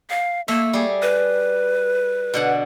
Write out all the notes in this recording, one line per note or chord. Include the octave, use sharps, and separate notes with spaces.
F5
A3 A#3 E5
G3 G#4
B4
B2 D3 F#5